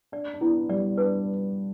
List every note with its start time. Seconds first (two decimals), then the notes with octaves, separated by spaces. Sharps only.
0.12 D4 D5
0.34 D4
0.41 B3 E4
0.69 G3 D5
0.97 D4 B4